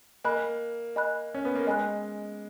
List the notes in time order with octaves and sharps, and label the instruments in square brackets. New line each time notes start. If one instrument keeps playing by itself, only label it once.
[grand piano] A#3 [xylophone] D#5 G#5 B5 F#6
[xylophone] D#5 G#5 B5 F#6
[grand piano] C#4
B3
A#3
[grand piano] G#3 [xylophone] D#5 G#5 B5 F#6